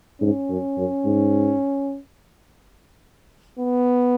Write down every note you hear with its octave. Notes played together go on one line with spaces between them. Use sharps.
G#2 C#4
F#2
F#2
G#2
B3